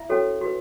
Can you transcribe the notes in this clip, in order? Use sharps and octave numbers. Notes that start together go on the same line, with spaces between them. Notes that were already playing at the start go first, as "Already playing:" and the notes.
Already playing: E4 E5
C#4 F#4 A4 C#5
F#4 B4